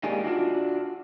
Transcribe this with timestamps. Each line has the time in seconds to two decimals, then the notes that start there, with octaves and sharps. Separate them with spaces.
0.03 G#3 A#3 D#4 G4 D5 G#5
0.24 D4 F4 F#4